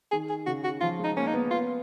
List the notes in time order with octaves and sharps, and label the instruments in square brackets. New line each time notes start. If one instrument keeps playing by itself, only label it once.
[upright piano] D#3 [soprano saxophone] G#4
[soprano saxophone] G#4
[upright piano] C#3 [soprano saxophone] F#4
[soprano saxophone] F#4
[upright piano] F3 [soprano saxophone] F4
[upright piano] G#3
[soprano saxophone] D#4
[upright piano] A#3 [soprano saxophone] C#4
[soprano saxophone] D#4
[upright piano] B3
[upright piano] B3 [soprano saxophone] F4